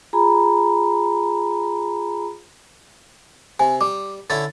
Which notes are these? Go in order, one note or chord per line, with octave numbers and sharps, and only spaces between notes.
F4 G#4 G#5 A#5 B5
C3 G#5
G3 D6
D3 C#4 E4 A6